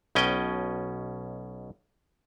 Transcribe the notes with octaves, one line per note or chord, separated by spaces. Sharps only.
B1 B2 C#4 D#5 G5